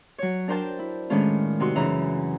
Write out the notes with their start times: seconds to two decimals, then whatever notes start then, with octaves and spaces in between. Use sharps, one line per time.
0.18 F#3 C#5
0.48 D4 A#4 C5 G5 A5
0.79 E4
1.10 A2 D#3 G#3 C#4 D4 F4
1.60 C3 D#4 F#4 C6 E6
1.75 F#2 C#3 E3 E5 A#5